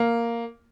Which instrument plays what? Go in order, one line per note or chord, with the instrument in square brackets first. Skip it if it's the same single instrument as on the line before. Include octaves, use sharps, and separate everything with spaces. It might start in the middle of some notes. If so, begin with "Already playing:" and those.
Already playing: [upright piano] A#3